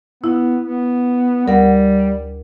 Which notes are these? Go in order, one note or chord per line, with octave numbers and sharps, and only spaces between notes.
B3 E4
B3
D2 G3 A#4 F#5